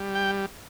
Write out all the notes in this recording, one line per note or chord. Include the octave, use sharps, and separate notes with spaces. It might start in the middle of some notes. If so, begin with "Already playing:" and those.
Already playing: G3
G5